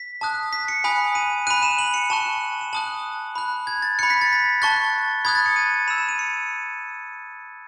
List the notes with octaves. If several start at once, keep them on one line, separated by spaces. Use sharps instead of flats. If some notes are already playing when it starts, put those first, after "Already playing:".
Already playing: B6
A5 D#6 F#6
B6
C#7
G#5 B5 D#6 F#6
D#7
B5 F#6 D#7
E7
F#7
C#7
A5 C#6 F#6 E7
E7
E7
A5 D#6 F#6 F#7
B5 F#6
G#6
A6
B5 F#6 C#7
B6
A6
B6
A5 C#6 F#6 A6
B5 D#6 F#6 G#6
A6
C#7
D#7
B5 E6 E7
E7
D#7
C#7